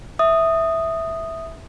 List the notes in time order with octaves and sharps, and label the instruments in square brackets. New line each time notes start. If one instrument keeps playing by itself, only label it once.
[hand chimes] E5 D#6